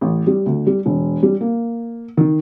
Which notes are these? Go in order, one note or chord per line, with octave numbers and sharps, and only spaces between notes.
A1
G3
D2
G3
E1
G3
A#3
D#3